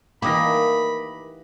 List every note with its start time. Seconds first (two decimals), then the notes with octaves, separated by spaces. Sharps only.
0.22 E3 A#3 D#4 G4 B5 D6 D#6 A#6